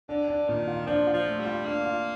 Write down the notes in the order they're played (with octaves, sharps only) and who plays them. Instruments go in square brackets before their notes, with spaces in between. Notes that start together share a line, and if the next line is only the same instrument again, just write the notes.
[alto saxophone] D3 [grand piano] D4
[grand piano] D4
[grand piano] A#2 [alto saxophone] D#3
[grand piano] F4
[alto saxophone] F3 [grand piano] D4
[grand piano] F4
[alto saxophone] F3
[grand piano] A3
[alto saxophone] G3
[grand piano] F4
[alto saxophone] A#3 [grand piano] D4
[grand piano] F4